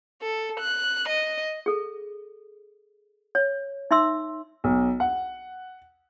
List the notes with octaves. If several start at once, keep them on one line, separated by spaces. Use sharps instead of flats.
A4
F#6
D#5
G#4 A4
C#5
D#4 E5 C6 E6
B1
F#5